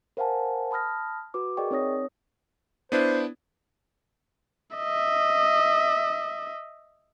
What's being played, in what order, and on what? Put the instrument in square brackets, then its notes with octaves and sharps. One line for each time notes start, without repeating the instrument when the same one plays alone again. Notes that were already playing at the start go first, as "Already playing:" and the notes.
[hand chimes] A#4 C5 F5 F#5 G#5 A5
A5 B5 D#6 F6 A#6
F#4 B4 D6
G#4 A#4 D5 D#5 G5 C#6
C4 D#4 C#5 D#6 A#6
[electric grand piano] B3 D4 E4 [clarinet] C5
[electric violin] D#5 E5